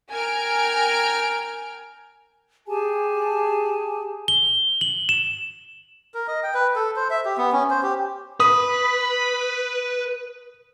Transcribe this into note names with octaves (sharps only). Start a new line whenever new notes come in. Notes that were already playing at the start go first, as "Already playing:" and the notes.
A#4 G5 G#5 F6 G#6 D7
G4 G#4 G#5 A5
G7
F#7
E7
A#4
D#5
G5
B4
A4
C5
E5
G4
B3
C#4
C5
G4
B4 D#6